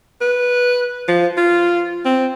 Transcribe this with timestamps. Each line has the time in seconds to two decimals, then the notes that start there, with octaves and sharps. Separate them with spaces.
0.21 B4
1.08 F3
1.37 F4
2.05 C4